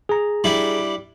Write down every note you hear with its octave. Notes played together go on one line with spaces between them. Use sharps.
G#4 A#5
G3 D4 E4